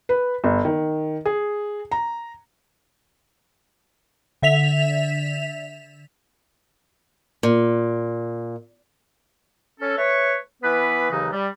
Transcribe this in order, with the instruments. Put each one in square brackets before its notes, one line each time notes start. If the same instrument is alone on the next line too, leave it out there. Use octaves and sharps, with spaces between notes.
[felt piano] B4
G1
D#3
G#4
A#5
[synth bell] D3 E5 B6 F7
[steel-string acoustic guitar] A#2
[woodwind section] C#4 A4
A3 B4 C#5
E3 B3 B4
D#2 C#3 E3 F#3 D#4
G3